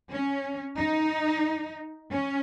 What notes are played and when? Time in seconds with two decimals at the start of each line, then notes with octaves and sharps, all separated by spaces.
0.12 C#4
0.78 D#4
2.12 C#4